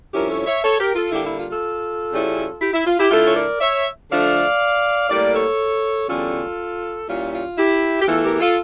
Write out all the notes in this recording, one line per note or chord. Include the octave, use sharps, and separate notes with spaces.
G2 F3 C#4 E4 G4 A#4
A4 C#5
C#5 E5
A4 C#5
G4 A#4
F4 A4
D3 G3 A#3 E4 G4
E4
F4
F4 A4
C#3 G3 C#4 E4
E4 G4
E4
F4
E4 G4
D3 A3 E4 F4 A4
C#5
A#4 D5
C#5 E5
D3 F3 A3 D4 D5 F5
A2 G3 A#3 A#4 D5
A4 C#5
E2 D3 G3 C#4 F4 A4
A#2 G3 C#4 E4 F4
F4
E4 G4
G4
E2 E3 A3 E4 F4 A4
G4 A#4
G4
F4 A4